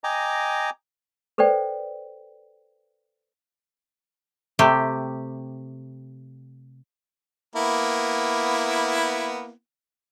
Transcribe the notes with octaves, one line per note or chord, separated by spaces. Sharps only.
D#5 G5 G#5 A#5 D6
A4 B4 C5 D5 G5
C3 A3 G4
A#3 B3 E4